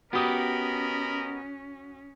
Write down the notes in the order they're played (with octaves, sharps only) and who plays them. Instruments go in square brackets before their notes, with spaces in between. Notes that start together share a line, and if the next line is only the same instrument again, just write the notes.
[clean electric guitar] B3 G4 [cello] C#4 [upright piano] F#4 D#6 [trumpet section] A#4 D#5 B5